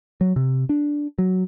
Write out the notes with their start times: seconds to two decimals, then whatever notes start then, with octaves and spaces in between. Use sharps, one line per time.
0.21 F#3
0.36 C3
0.69 D4
1.19 F#3